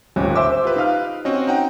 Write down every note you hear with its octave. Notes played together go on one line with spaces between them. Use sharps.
D#1 G#1 D2 C#4 G5
C5 E5 D6 E6
F4 G4 B4
D#4 F5 F6
C4 C#4 F#4 D#5
D#4 F#5 G5